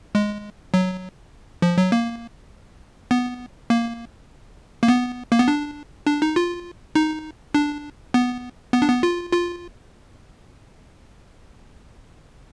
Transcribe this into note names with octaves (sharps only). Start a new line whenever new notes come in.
G#3
F#3
F3
F#3
A#3
B3
A#3
A#3
B3
A#3
B3
D4
D4
D#4
F4
D#4
D4
B3
B3
D4
B3
F4
F4